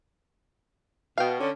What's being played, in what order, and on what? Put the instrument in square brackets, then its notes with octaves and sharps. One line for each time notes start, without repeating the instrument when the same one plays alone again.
[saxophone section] B2 [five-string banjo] F5 G5
[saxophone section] D3 C#4